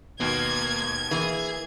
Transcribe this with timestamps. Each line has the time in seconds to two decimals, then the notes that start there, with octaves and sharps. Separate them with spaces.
0.20 D#2 B2 A#3 B3 G#6
1.11 E3 A#3 G#4